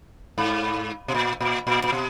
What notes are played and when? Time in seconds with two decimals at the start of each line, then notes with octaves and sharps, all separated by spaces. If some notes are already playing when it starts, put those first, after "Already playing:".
0.38 G#2
1.08 B2
1.15 A#2
1.41 A#2
1.67 A#2
1.84 A#2
1.92 B2